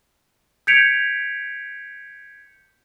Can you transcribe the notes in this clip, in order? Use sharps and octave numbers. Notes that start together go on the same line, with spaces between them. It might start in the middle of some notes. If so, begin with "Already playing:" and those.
G6 G#6 B6 C#7 D7 F7